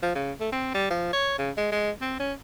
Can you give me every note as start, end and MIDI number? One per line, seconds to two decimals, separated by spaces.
0.03 0.14 53
0.16 0.32 49
0.40 0.49 57
0.53 0.72 60
0.74 0.86 55
0.90 1.10 53
1.13 1.38 73
1.39 1.51 49
1.57 1.71 56
1.72 1.91 56
2.02 2.18 60
2.20 2.33 61